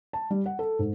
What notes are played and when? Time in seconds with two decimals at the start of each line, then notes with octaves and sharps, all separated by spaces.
0.13 A5
0.30 G3
0.46 F#5
0.59 A4
0.79 G#2